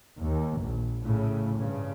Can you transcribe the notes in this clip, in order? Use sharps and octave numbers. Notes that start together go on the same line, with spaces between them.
D#2
A#1
A2 C#3
G2 C#3